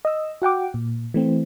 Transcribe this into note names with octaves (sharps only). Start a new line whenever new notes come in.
D#5 E6
F#4 F#5 G5 D6
A#2
E3 A3 C4